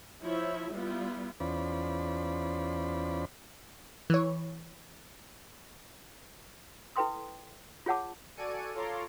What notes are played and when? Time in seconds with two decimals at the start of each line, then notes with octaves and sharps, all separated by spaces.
0.23 F3 E4 C#5 E5
0.72 G3 B3 E4 F4
1.40 E2 C#4 F4 C5 D5 B5
4.10 E3 C#5
6.96 E4 A4 B4 G5 C6 D#6
7.86 F4 G#4 C#5 F#5 A5 D6
8.37 F#4 A4 D5 G#5 C#7 D#7
8.74 F4 A4 C#5 A#5 C6 D6